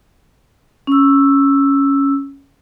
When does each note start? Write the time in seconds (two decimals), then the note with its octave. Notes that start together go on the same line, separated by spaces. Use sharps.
0.87 C#4 E6